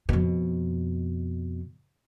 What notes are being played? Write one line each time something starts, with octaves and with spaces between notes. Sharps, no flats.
F2 B2